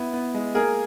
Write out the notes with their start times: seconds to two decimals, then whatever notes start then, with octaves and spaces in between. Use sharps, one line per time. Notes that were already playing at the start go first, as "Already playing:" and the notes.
Already playing: B3 E4
0.13 B3
0.34 G#3
0.55 A#3 G#4 A#4